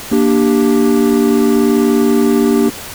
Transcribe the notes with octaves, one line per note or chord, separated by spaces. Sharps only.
A#3 D4 G4